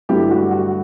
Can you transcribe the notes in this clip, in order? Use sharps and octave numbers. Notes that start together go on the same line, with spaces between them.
G2 D3 F#3 A3 E4 G4
F#4
F#4